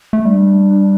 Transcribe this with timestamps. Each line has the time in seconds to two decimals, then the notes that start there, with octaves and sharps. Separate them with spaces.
0.13 A3
0.25 G3 D4